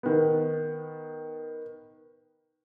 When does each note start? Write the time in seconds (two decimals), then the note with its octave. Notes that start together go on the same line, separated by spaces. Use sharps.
0.03 D#3 B3